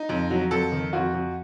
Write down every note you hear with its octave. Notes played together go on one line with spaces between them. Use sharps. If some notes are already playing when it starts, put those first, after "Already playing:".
Already playing: D#4
F2
F#3
F2 A4
D#3
F2 F#4
F2